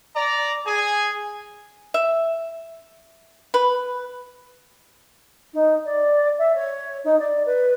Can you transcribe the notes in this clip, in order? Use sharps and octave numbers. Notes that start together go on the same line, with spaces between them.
D5 A#5
G#4 G#5
E5
B4
D#4
D5
E5
C#5
D#4
D5
B4